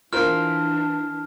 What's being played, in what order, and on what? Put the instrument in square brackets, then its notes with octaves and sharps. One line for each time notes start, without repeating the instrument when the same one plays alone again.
[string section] E3 [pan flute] D4 [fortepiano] F4 A#4 C5 [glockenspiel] F6